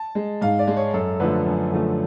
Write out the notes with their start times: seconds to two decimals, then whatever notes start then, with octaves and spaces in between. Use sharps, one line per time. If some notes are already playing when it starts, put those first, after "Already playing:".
Already playing: A5
0.15 G#3
0.41 G#2 F5
0.59 D5
0.67 G#3
0.77 C#5
0.94 F#2 A4
1.20 D3 F3 A3 B4
1.46 F#2
1.72 D3 F3 A3